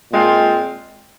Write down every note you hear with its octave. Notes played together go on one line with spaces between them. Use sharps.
A#2 G#3 C4 F4